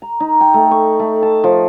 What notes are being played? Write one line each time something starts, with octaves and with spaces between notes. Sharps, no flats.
A#5
D#4
G5
A3
C#6
A3
A5
F3